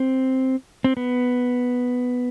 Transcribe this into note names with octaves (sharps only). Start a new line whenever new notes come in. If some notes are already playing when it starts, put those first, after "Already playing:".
Already playing: C4
C4
B3